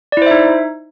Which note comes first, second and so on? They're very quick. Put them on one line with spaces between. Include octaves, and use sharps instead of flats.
D5 E4 C5 E5 D#4